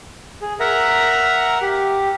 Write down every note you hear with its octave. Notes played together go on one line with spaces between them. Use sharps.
G#4
A#4 E5 F#5 A#5
G4